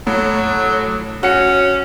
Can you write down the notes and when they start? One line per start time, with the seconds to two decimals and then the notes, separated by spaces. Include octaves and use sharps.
0.07 A2 F#3
1.23 C#4 F#4 C#7